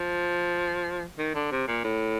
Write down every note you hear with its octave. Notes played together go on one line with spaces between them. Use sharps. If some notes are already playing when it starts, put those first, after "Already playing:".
Already playing: F3
D#3
D3
C3
A#2
A2